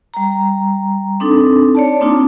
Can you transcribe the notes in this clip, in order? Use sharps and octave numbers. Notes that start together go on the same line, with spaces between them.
G3 A#5
C4 D4 D#4 A4
C#5 D5 A5
A#3 C4 D4 D#4 F4